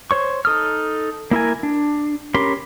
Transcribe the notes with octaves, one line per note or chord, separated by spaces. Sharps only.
C5 C#5 C#6
D#4 A4 D#6 F6
A#3 E4 A#4 G#5
D4
C#4 G4 A#4 B5 C6